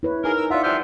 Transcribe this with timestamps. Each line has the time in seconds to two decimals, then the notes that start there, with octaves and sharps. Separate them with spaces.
0.03 E4 B4 C#5
0.24 D#4 G#4 A#4
0.38 E6
0.50 F4 D5 E5 F#5
0.63 G2 F3 C5 E5 F6